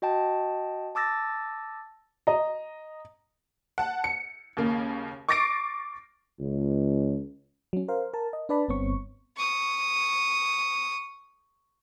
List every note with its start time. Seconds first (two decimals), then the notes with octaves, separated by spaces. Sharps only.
0.02 F#4 D#5 G5 A5
0.95 A5 D6 E6 A6 A#6
2.27 D#5 A#5
3.78 F#5 A5
4.04 C#7
4.57 D#2 C#3 A#3
5.29 C#6 D6 A6 A#6 C7 D7
6.40 C#2
7.73 F#3 C#4
7.88 A#4 C5 F5
8.13 A#4 A5
8.33 D#5
8.49 D4 B4 D5 A5 B5
8.68 G1 G2 B3 C4 C#5 C#6
9.37 C#6 D#6